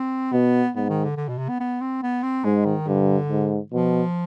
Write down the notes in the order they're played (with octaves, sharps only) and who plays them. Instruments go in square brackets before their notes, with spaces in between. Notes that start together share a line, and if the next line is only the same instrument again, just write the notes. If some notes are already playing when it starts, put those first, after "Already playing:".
Already playing: [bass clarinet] C4
[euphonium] B2 [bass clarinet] B3
[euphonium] G#2 [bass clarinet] B3
[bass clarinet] D#3
D3
D3
B2
C3
B3
B3
C4
B3
C4
[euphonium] G#2 [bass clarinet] G#3
[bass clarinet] D#3
[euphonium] G2 [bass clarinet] D3
[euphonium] G#2
[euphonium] B2 [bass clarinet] F3